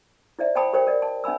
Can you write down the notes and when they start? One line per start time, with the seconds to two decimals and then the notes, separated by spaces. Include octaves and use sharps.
0.39 E4 C5 D5 E5
0.55 C5 F#5 G5 A5 B5 D#6
0.73 G4 A#4 C5 C#5 G5
0.87 A#4 D5 D#5 F#5
1.02 A5
1.24 C#4 E5 G#5 B5 E6